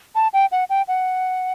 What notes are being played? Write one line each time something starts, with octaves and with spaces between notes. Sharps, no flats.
A5
G5
F#5
G5
F#5